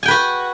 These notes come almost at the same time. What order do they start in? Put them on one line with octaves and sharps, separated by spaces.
G#5 G5 B4 F#4